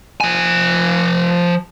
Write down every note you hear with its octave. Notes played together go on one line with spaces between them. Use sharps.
F3 G#5